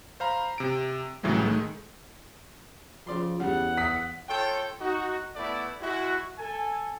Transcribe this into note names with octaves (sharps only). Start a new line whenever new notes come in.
C5 F5 A#5 B5
C3 D7
C2 A2 C#3 E3 F#3 G#3
D#3 G#3 A3
C#3 F3 D5 C6
E2 C#3 G3 F#5
E5 D#6 B6
F4 A4 C#5 G5
D#4 F#4
A3 B3 E4 A4 D5
G#3 E4 F#4
A4 G#5